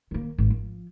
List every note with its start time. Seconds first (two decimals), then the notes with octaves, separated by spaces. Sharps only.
0.11 D#3 A#3
0.38 G#1
0.50 F3